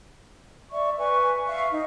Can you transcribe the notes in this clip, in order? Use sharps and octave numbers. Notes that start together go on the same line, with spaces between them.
D5 E5 C#6
B4 G#5 C#6
E5 F5 C#6
D#4